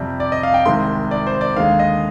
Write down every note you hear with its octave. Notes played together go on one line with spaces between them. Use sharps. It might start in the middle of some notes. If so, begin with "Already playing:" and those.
Already playing: F2 C3 G3
D5
D#5
F5
G5
C2 C3 D#3 G#3 C6
D5
C5
D5
D#2 D3 G#3 F5
D#5